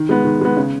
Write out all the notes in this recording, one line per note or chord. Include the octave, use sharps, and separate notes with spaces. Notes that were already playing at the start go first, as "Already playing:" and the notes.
Already playing: D#3
G#3 B3
D#3
G#3 B3
C#3